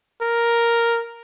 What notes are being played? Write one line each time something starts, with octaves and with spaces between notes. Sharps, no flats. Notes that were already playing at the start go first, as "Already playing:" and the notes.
A#4